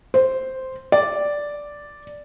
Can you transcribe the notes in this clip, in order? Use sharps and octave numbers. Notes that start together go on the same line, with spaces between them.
C5
D5